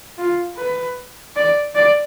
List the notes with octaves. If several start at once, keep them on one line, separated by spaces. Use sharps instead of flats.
F4
B4
D5
D5